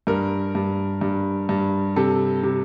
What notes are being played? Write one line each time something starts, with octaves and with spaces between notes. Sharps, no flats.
G2 A#4
G2
G2
G2
C3 A4
C3